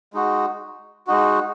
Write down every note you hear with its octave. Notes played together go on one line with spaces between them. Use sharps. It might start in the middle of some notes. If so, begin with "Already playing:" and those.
G#3 D#4 F#4
G#3 D#4 F#4